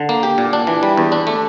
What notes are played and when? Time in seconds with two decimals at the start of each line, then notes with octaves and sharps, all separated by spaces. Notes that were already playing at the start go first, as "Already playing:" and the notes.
Already playing: D3
0.09 A#3
0.23 G4
0.38 A#2
0.53 D4
0.67 E3
0.83 G3
0.97 E2
1.12 D4
1.27 A3